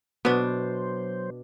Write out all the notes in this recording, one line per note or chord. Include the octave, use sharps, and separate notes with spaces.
B2 F#3 B3 D4 C5